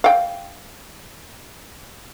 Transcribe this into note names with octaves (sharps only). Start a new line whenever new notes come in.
F5 G5